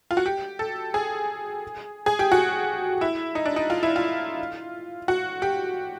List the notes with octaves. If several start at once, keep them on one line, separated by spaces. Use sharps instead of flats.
F4
F#4
G4
A4
G#4
G#4
G4
F#4
E4
D#4
D4
D#4
F4
E4
F4
F#4
G4